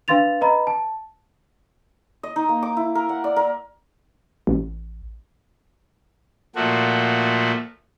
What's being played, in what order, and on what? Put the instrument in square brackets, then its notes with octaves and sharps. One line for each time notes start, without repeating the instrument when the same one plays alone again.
[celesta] D4 B4 F5 C6 A6 F7
B4 D#5 A#5 B5
A5
[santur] D#5
D#4
A#3
D6
E4
A#4
F#5
D5
A#4
[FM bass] A1
[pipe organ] A#2 F3 A3 F#4